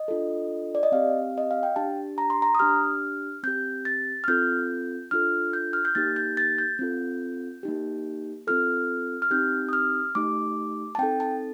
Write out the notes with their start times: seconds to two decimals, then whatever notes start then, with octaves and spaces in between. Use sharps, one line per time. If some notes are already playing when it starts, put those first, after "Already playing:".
Already playing: D#5
0.08 D4 F4 A4
0.75 D5
0.83 D#5
0.92 C4 G4 F5
1.38 D#5
1.51 F5
1.63 G5
1.76 D4 G4 A5
2.18 A#5
2.30 C6
2.42 A#5
2.55 D#6
2.59 D4 G4 F6
3.43 C4 G4 G6
3.85 A6
4.24 F6
4.28 C4 F4 A4 G6
5.11 D4 F4 A4 F6
5.53 G6
5.73 F6
5.85 G6
5.95 A#3 D#4 G4 A6
6.16 G6
6.37 A6
6.58 G6
6.79 C4 F4 A4
7.63 A#3 D#4 G4
8.47 C4 F4 A4 F6
9.22 F6
9.31 C4 D#4 G4 G6
9.69 D#6
9.73 F6
10.15 A3 D#4 G4 D6
10.95 A5
10.99 C4 D#4 A4 G5
11.20 A5